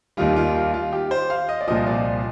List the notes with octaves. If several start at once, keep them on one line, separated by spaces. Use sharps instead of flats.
D#2 D#3 G3 F4
F4
F4
F4
G4
C5
F5
D#5
D5
C2 A#2 F3 D#5
D5